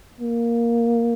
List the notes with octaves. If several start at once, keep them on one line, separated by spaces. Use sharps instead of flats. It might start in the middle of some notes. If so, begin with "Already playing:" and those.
A#3